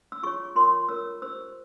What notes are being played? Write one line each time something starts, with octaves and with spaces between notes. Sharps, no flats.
E6
F4 G#4 C#5 C#6
F4 A#4 C#5 C6
F4 A#4 C#5 E6
G4 C5 E6